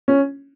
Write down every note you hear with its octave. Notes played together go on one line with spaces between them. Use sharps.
C#4